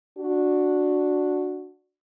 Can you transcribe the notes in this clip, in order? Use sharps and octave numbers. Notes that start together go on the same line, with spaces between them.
D4 F#4